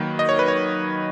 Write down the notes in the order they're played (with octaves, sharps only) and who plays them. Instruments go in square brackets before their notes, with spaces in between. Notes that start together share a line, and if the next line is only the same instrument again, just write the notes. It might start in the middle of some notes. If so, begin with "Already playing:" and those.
Already playing: [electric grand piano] D#3 F#3 A#3 B4
D#5
C#5
B4
C#5